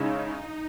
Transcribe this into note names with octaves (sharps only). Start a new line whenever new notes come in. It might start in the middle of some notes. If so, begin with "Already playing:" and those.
Already playing: C#3 G#3 C#4 D#4 E4